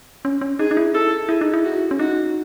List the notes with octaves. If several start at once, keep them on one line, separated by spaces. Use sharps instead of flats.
C#4
C#4
D#4 G#4
D#4
E4
A4
E4 G#4
D#4
E4
F#4
C#4
D#4 F#4